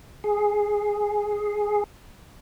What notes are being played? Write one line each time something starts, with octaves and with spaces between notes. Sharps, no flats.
G#4